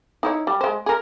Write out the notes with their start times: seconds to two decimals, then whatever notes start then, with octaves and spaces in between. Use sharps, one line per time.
0.23 D#4 E4 C#5
0.47 G3
0.61 G#3 C5
0.86 G#4 A#4